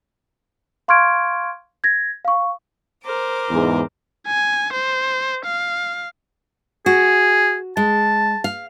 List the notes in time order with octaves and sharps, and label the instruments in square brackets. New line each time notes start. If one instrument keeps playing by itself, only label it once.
[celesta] F5 C6 C#6 F6 G#6 D7
G#6 A#6
F5 C#6
[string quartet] A#4 C5 D6
[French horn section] E2 G#2
[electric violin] G#5
C5
F5
[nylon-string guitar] F#4 [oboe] G#4
[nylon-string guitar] G#3 [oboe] A5
[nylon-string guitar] F5